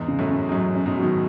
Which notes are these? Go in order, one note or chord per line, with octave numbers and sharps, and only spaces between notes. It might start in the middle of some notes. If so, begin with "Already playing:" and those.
Already playing: E2 G#2
C#3
F#2 A2
C#4
G#2
F#2 F#3
C#4
G#2 B2
F#3
B2 D#3